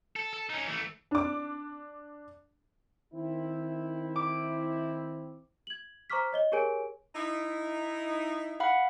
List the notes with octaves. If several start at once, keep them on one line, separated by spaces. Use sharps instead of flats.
A4
A4
C#4 D#4
E3 A3
D4 D6
D#3 C4 E4
D6
G#6 F#7
C5 A#5 C#6 D6 F6 B6
C#5 D#5 G7
G4 G#4 A#4 C#5 G#5 D7
D#4 E4
F5 F#5 B5